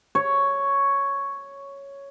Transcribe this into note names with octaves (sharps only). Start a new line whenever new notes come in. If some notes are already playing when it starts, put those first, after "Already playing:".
C#5